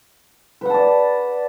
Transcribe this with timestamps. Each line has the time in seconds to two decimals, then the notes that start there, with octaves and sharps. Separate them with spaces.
0.61 B4
0.65 F#5
0.70 A5
0.74 D5